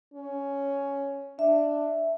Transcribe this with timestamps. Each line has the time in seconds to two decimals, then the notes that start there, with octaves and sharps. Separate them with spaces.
0.14 C#4
1.39 D4 E5